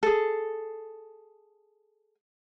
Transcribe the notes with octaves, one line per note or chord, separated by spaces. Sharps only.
G#4 A4